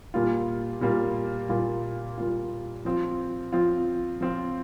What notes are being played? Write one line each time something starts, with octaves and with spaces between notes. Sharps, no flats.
A#2 G3 A#3 F4
A#2 G3 A#3 F4
A#2 G3 A#3 F4
A#2 G3 A#3 F4
F3 C4 F4
F3 C4 F4
F3 C4 F4